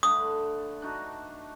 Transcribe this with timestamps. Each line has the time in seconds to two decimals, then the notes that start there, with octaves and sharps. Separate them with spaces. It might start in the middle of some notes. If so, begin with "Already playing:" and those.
0.03 D3 A3 B4 D#6
0.82 D4 D#4 F#4